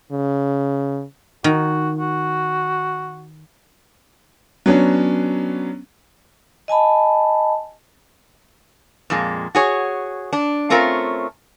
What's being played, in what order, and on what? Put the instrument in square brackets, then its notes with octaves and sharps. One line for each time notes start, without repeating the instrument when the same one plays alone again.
[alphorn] C#3
[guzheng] D#3 [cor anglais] F#4
[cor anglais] F#4
[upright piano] F#3 B3 C#4 D4
[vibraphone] D#5 G#5 A5 B5
[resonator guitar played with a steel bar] F2 A#2 G#3
F#4 G#4 C#5
D4
A3 C4 C#4 F4 A#4